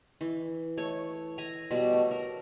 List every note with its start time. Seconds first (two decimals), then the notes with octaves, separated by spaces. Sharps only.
0.21 E3
0.77 A3 C#5
1.38 E5 G#5 A#5
1.71 B2 F#3 G3
1.93 A3
2.11 A#4